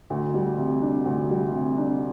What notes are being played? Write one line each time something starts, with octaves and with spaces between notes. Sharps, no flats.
D2
G3
C3
D4
D2
G3
C3
D4